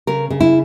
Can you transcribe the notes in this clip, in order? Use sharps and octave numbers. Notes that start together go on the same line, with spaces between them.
C#3 A#4
C#3
E4